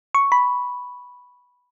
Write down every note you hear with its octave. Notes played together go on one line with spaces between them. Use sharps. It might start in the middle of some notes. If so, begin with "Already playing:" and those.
C#6
B5